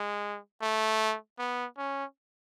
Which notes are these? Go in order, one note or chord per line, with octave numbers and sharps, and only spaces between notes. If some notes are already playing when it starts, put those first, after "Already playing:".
Already playing: G#3
A3
B3
C#4